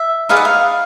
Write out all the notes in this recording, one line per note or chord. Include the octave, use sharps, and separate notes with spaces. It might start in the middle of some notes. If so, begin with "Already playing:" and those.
Already playing: E5
D#4 G#4 B4 D5 F5
F#5
F5